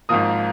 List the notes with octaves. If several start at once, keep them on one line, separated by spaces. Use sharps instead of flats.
G#1 G#2 F3 A#3 D#6